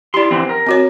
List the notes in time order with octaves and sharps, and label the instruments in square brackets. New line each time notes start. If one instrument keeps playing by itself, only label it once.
[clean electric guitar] E4 C6 [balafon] G4 D5
[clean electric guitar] D3 E3 C4
A#4
[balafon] C4 F#4 C#5